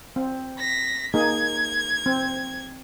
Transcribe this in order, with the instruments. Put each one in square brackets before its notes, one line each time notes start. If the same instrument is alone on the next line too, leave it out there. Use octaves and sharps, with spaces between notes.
[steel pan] C4
[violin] A#6 B6
[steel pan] A#3 D#4 G#4 [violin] G#6
[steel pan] C4